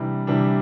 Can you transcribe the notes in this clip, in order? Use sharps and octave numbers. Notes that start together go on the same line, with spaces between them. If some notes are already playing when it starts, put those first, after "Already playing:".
Already playing: C3 E3 G3 D4
C3 E3 G3 D4